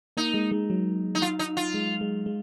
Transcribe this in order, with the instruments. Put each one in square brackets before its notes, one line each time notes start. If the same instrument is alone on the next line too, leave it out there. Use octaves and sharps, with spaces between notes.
[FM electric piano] A#3 [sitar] D#4
[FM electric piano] G#3
G#3
F#3
[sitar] D#4
F4
D#4
F4
[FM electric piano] G#3
G#3
G#3